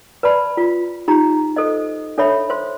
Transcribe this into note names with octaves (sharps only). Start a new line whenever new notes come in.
B4 D5 A5 B5
F4
D#4 F4 G4 A#5
A4 C5 D#5
D4 A4 C#5 E5 B5
C5 C6